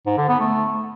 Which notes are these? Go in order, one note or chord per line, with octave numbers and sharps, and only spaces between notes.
G#2
D3
B3
A3